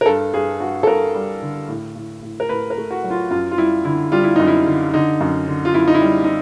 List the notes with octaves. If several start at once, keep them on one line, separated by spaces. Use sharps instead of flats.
A#4
G2 A4
G2 G#4
G2 F#4
A4
G2 A#4
G3
D3
A2
A2
A2
A#4
A2 B4
A#4
A3
F#4
F#3
F4
F#2 F4
F4
G3 E4
D3 E4
G3 F4
E4
F#2 D#4
E4
D3
D3 D#4
F#2
D3
F4
F#2 E4
D#4
E4
G3
D#4